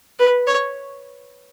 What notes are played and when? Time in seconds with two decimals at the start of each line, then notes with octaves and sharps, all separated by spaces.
0.19 B4
0.47 C#5